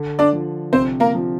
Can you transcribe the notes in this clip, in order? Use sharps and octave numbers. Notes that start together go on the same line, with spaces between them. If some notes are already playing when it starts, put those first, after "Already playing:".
Already playing: D3
D4 D5
F3
C3 C4 C5
A#3 A#4
F3